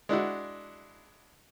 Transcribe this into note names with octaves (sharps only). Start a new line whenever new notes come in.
G#3 D4 E4 F#4